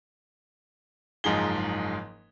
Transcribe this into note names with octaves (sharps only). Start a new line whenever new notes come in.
F#1 G#2 F3 D#4 G#4 G7